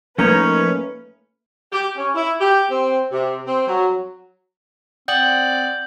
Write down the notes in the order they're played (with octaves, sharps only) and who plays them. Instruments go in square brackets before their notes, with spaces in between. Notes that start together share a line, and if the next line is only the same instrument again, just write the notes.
[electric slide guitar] F3 D#4 C#5 [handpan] A3 A#3 A#4 [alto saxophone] C#4 [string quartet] B4
[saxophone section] G4
C#4
E4
G4
C4
C3
C4
F#3
[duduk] C4 [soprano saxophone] D5 [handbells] F#5 G5 D#6 [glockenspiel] G6 F#7